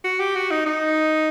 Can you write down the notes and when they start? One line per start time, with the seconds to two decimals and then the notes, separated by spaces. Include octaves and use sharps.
0.04 F#4
0.20 G4
0.36 F#4
0.51 D#4
0.66 D#4